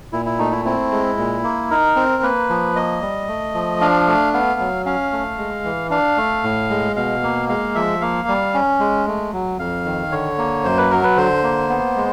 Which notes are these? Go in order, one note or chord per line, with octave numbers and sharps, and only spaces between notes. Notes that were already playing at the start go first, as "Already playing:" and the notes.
A#2 E4
E4
A3 D#4
E4
C4 E4
G#3
A#2
A#3
D#4 A#4
C4
A#3 B4
F3
A#3 D#5
G3
A3
F3
D4 F5
A3
B3 F5
F#3
C#4 F5
A3
G#3
E3
D4 F5
A3
A2
G#3
B2 F5
A#3
G#3 F5
F3 E5
A#3 F5
G3
C#4
G#3
A3
F#3
F2 F5
D#3
D3 C#5
A#3
F#2 C5
B4
F#3 A#4
B4
D3 C5
A#3
B3
G#3